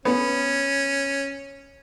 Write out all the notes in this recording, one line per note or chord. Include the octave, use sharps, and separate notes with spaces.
B3 C#4